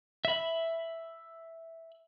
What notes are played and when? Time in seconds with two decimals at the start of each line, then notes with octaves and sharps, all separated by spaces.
0.25 E5 B5